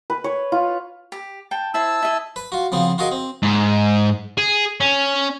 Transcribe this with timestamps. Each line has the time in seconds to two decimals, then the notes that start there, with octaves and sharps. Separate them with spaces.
0.10 B4
0.24 C#5
0.52 F4
1.12 G4
1.51 G5 A5
1.74 E4 C5 A5 E6
2.02 E4 D#5
2.36 B4
2.52 F4 F#4
2.72 C#3 F3 B3 C4
2.98 F4 F#4 G#4 A#4 D#5
3.12 C4
3.43 G#2
4.38 G#4
4.80 C#4